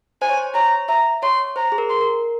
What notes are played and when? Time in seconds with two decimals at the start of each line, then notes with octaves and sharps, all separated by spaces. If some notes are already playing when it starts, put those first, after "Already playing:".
0.22 C5 G#5
0.29 C#5
0.37 C5
0.54 C#5 A#5
0.89 E5 A#5
1.23 C#5 C6
1.56 C5 A#5
1.72 G#4
1.78 A#4
1.89 C6
2.01 A#4